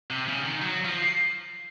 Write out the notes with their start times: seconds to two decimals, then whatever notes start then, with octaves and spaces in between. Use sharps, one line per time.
0.10 C3
0.28 C#3
0.45 D#3
0.62 F#3
0.85 F3